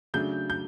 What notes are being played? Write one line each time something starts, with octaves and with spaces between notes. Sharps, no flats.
C#3 F#3 A3 D4 G6
G6